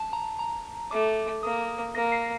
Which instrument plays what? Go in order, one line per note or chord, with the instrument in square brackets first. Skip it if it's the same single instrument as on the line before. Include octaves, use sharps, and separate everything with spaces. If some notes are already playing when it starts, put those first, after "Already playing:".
Already playing: [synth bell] A5
A#5
A#5
[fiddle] A3 [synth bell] D6
[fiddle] A#3 [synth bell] D#6
[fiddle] A#3 [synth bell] A#6
[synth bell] C7